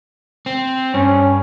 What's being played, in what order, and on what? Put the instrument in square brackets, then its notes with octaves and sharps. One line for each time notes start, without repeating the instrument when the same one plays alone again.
[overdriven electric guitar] C4
[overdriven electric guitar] G2 [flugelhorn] C#4